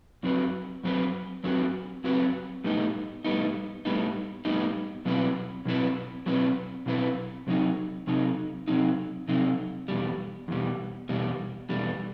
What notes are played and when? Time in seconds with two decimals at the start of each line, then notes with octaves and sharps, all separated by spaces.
0.23 F#2 F#3 C4 F#4 B4
0.83 F#2 F#3 C4 F#4 B4
1.44 F#2 F#3 C4 F#4 B4
2.04 F#2 F#3 C4 F#4 B4
2.64 A2 G3 B3 D#4
3.24 A2 G3 B3 D#4
3.85 A2 G3 B3 D#4
4.45 A2 G3 B3 D#4
5.05 B2 F#3 C4 E4 B4
5.65 B2 F#3 C4 E4 B4
6.26 B2 F#3 C4 E4 B4
6.86 B2 F#3 C4 E4 B4
7.47 C3 F#3 C4 D#4
8.07 C3 F#3 C4 D#4
8.68 C3 F#3 C4 D#4
9.28 C3 F#3 C4 D#4
9.88 E2 B2 G3
10.48 E2 B2 G3
11.09 E2 B2 G3
11.69 E2 B2 G3